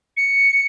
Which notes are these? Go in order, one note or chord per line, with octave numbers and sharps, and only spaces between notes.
C#7